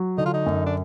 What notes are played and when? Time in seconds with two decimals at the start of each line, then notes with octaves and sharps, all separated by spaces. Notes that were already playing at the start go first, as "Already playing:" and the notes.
Already playing: F#3
0.18 D3 D#4
0.25 F4
0.34 D#4
0.46 F#2
0.66 D4